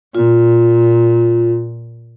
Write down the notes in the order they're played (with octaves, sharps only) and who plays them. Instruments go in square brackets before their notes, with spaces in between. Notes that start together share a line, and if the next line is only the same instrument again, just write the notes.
[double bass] A#2 [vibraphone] F4